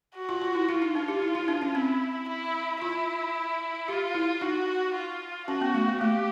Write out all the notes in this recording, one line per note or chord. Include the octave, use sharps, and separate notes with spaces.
F#4
F4
F4
E4
E4 F4
D#4
D4
G4
E4
E4
D4
C#4
C4 E4
E4
E4 F4
F4 G4
E4
D#4 F#4
F4
C#4 F#4
B3
A3
A#3
A3 G4